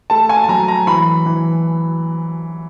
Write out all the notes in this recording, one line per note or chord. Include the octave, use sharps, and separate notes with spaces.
A3 A5
G#5
A5
F#3 A#5
A#5
E3 B5
E3